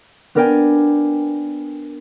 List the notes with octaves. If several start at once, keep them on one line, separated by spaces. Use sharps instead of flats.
B3 D4 A#4 D5 G5 G#5